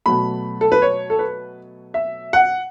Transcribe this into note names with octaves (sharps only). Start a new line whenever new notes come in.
B2 F#3 A3 B5
A4
B4
C#5
A4
B4
E5
F#5